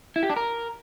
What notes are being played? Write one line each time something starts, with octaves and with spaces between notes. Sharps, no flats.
E4
G4
D4
A#4